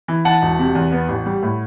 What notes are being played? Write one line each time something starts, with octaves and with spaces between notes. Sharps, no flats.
E3
E3 F#5 A5
E1
C3
E2
B3
A1
G3
A2